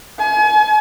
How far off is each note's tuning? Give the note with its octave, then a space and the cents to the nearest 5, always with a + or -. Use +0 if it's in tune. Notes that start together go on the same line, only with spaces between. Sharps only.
G#5 +40